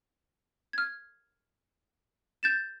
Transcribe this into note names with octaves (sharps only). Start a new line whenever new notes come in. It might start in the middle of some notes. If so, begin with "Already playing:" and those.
F6 G#6
G6 A6 E7